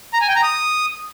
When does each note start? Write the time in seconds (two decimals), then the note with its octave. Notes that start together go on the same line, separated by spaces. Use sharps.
0.14 A#5
0.21 G#5
0.28 G5
0.36 A#5
0.43 D#6